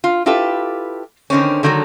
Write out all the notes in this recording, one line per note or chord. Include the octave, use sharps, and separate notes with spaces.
F4
E4 F4 G4 A4 B4
D3 D#3 C4 C#4
D3 D#3 F#3 G#3 A4